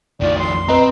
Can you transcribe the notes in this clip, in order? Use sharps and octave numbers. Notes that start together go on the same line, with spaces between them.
A#1 F2 D#3 F3 A3 D5
C6
C4 B4 D#5 A#5